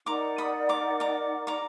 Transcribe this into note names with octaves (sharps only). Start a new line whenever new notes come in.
D#4 A#4 D5 F#5 A#5 D6
B5 D#6
A#5 D6
A#5 D6
A#5 D6